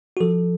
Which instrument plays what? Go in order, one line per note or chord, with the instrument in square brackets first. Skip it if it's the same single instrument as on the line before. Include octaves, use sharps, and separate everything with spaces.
[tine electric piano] F#4
F3 A4